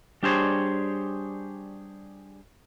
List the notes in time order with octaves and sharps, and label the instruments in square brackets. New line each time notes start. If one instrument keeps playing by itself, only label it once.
[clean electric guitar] G3 D4 G4 G#4 C5 C#5